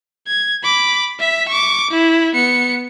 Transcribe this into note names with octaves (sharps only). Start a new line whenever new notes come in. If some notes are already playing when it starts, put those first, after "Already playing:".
G#6
B5 D6
E5 B6
C#6 D6
E4
B3 C#7